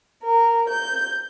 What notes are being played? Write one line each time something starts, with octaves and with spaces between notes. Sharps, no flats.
A#4
G6